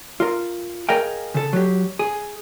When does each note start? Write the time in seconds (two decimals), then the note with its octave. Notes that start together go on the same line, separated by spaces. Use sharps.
0.20 F4 A#4
0.89 G#4 A#4 D#5 F5 G5
1.34 C#3 A4
1.53 F#3 G4
1.99 G#4